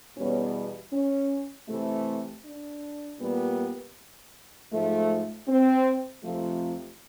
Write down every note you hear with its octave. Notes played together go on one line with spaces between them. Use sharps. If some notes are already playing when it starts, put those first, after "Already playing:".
E2 B2 G3 B3 C#4
C#4
C3 E3 A3
D4
A#2 G3 B3
G#2 F3 A3
C4
F2 C3 F3 A3